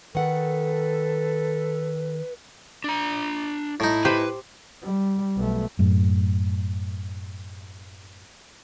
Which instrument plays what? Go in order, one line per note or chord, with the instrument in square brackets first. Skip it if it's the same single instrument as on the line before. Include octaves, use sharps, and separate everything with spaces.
[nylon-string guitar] D#3 F#5 [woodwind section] A4 [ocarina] B4
[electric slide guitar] D4 A#5
[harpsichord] A2 D#4 [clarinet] E4
[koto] G4 C5 [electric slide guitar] B4
[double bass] G3
B1 A3
[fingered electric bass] F#2 A2